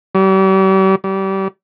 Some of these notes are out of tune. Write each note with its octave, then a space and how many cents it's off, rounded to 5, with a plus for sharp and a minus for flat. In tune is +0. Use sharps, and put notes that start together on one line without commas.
G3 -40
G3 -25